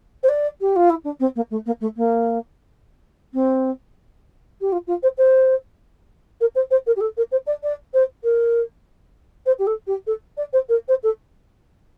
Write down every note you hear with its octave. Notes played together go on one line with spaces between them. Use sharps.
C5
D5
G4
F4
E4
D4
C4
A#3
A3
A#3
A3
A#3
C4
G4
F4
F4
C5
C5
A#4
C5
C5
A#4
G4
A4
A#4
C5
D5
D5
C5
A#4
C5
G4
A4
G4
A4
D5
C5
A#4
C5
A4